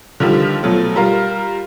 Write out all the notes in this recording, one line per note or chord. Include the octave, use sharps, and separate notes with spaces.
D3 D#3 F3 G3
B2 F3 F#3 A3
G3 F4 A#4